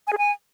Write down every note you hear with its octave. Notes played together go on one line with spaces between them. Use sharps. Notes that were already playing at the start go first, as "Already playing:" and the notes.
G#5
G#4
G#5